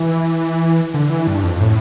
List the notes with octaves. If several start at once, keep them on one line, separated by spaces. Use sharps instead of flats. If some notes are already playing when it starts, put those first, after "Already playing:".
Already playing: E3
D3
E3
G2
F2
A2